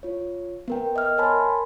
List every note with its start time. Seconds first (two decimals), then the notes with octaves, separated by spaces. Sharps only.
0.03 F4 C#5
0.68 B3 A#4 G5
0.96 D#5 E5 F6
1.18 A#4 C#5 G#5 A5 B5 C6